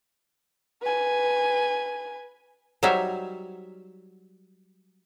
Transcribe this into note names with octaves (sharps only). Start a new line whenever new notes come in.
B4 G#5
F#3 G3 D#4 C5 C#5 E5